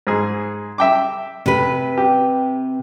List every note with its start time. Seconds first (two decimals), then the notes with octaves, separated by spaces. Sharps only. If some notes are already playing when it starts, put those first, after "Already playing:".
0.07 G#2 G#4
0.78 E5 G5 D6
1.46 C3 B4
1.98 G4